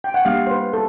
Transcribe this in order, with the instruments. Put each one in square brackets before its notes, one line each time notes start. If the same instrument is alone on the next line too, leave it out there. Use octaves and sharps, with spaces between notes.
[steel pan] G5
F#5
[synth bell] G3 A#3 D4 G4 [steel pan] F5
[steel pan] C5
B4
A4